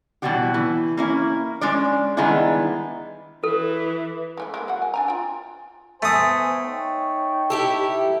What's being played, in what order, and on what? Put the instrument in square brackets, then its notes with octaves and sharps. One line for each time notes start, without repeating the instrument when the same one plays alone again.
[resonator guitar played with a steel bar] B2 E3 F#3 G3 F#4 G4
E3
A#3 C#4 E4
G#3 C#4 D4 D5
D#3 G3 G#3 B3 D4 E4
[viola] E3 [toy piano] A4
[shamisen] G#3 A3 E4
G#3 A#3 E4
F#3 F#5
G#5
D4 G#5 A#5
F4 G5
[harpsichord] A3 D#6 [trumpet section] B3 C5 G#5
[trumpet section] D#4 C#5 G5
[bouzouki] E4 G4 A4